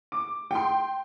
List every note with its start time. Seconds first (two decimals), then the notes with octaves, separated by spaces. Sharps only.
0.12 D6
0.51 G5 C6